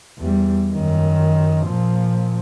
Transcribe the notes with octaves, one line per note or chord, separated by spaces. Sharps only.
E2 G3
F#2 D#3
A#2 F3